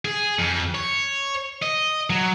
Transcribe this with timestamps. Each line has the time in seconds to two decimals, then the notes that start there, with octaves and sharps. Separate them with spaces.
0.05 G#4
0.39 F2
0.74 C#5
1.62 D#5
2.10 F#3